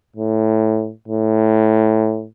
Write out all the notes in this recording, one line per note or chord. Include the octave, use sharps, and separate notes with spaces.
A2
A2